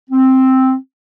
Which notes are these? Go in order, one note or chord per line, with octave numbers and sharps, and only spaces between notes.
C4